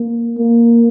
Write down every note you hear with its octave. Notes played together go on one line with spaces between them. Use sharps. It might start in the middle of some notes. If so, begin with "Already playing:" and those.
Already playing: A#3
A#3